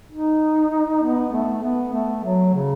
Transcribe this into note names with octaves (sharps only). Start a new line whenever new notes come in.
D#4
B3
A3
B3
A3
F#3
C#3